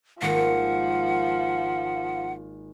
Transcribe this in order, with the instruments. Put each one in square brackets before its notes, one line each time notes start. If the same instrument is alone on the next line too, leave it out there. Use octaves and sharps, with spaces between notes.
[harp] G#1 A#3 A#6 [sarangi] F3 [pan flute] F#5